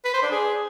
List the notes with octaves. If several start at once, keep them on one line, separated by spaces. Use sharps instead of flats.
B4
C5
D4
G#4